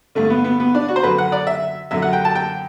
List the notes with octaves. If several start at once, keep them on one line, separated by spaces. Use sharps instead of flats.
G2 D3 A3
B3
B3
B3
D4
F#4
C5
F#2 D3 B4
F#5
D5
E5
F#2 D3 E5
F#5
G5
A5
G5